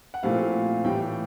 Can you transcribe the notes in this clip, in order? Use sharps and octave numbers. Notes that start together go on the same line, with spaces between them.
F#5
A#2 F3 A3 C4 E4 F5
A2 E3 G3 G5